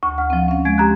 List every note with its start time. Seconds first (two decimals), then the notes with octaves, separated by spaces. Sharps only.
0.03 D2 C#6
0.18 F#5 F6
0.30 F3 C4
0.48 C#4 F5
0.65 G#3 G#6 D7
0.78 G4 A#5 F#6